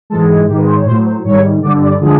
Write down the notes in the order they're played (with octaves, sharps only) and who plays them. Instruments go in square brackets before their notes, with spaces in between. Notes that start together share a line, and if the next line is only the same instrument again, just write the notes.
[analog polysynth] G#2 E3 G#3 A4
G#4
G#2 D#3 G#3 G4
B4
C5
C#5
A2 C5
F#3
C5
G#2 D#3 G3 C#5
G2 D3 G3 D5
D5
D3 F3 G#3 G#4